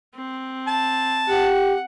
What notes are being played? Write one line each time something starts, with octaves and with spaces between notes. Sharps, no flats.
C4
A5
G4 F#5